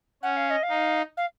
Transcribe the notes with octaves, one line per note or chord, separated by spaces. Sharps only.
C#4 F#5
F5
D#5
F5
D#4
F5